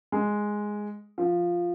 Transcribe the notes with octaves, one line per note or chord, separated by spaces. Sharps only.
G#3
F3